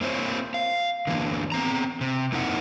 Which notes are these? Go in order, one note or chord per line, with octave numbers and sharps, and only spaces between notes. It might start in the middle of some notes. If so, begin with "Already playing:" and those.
A#3 C4 E4 C5 C#5
F5
D3 E3 A#3
B3 C4 A#5
C3
F2 A#3 D#4 E4 A#4 F#5